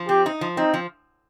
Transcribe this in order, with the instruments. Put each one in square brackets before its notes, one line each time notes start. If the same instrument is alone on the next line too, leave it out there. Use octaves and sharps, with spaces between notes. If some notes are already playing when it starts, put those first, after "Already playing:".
Already playing: [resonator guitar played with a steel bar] F3
[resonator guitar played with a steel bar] C4 [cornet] G4
[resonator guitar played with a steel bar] D#4
F3
[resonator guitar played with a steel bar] C4 [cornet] D#4
[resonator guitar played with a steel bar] F3